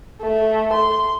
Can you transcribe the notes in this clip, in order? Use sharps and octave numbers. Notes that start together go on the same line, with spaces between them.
A3
C6